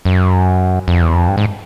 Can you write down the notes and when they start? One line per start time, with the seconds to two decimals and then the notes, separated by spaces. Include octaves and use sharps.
0.05 F#2
0.88 F2
1.02 E2
1.15 F2
1.28 G2
1.37 G#2